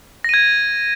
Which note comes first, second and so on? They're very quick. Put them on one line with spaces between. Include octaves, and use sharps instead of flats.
A#6 D#7 G#6